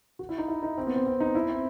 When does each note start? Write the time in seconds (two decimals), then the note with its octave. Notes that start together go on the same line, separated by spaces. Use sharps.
0.19 F#4
0.29 E4
0.38 D#4
0.48 E4
0.63 D#4
0.78 C4
0.87 B3
0.96 C4
1.06 C4
1.20 D#4
1.35 E4
1.49 C4